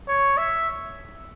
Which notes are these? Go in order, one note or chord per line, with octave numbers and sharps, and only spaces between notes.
C#5
E5